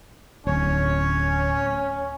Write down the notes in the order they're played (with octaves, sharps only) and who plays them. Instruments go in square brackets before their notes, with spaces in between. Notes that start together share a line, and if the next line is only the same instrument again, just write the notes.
[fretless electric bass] D1 [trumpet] C#4 [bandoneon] C#5